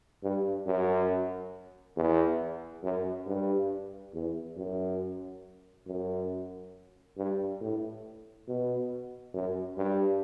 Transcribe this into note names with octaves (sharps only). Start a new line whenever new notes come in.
G2
F#2
E2
F#2
G2
E2
F#2
F#2
G2
A2
B2
F#2
G2